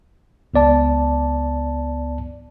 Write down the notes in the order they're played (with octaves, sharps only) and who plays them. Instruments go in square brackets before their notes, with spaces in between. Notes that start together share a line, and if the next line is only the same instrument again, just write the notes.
[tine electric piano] C#2 B3 D5 A5